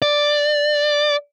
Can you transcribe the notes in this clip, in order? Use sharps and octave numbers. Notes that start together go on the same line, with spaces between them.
D5